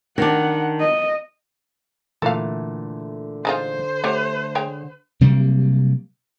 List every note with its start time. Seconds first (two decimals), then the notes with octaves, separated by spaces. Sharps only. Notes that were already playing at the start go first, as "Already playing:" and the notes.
0.18 D#3 D4 F#5
0.80 D#5
2.22 A#2 D3 E3 A3 A4 F5
3.45 G#3 D#4 F4 C5
4.04 A3 G4 C#5 F#5
4.55 G#3 C#5 G5
5.21 C3 F#3 G3 A#3